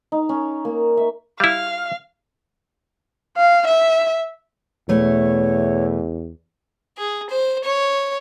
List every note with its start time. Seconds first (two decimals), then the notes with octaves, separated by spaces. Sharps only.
0.12 D#4
0.29 C#4
0.65 A#3
0.97 E5
1.40 G3 E4 F5
3.37 F5
3.67 E5
4.89 E2 B2 A3 C#5
6.98 G#4
7.30 C5
7.64 C#5